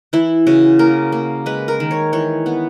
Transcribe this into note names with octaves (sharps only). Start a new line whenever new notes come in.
E3 E4
C#3 F#4
A#3 A#4
A#3
G#3 B4
A#4
D#3
C#5
E3 C#5
B3